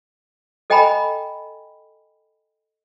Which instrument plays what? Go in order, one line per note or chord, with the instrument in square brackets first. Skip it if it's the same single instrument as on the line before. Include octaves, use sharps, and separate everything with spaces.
[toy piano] A4 D#5 G5 G#5 A#5 B5